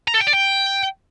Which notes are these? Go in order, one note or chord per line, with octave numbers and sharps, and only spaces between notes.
A#5
A4
G5
D5
G5